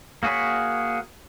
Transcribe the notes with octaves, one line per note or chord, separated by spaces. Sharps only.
A#3 F#4 G#4 C#5 B5